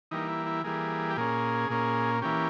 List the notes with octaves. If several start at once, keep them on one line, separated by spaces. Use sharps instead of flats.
E3 G3 A#3 D#4
E4
E4
E3 G3 A#3 G#4
G4
A#2 A#3 C#4 G#4
A#2 A#3 C#4
E3 A#3 C#4 G4